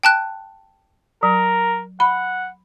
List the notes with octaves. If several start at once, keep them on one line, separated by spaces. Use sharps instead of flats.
G5 A5 F#6
F#3 A#4
F#5 B5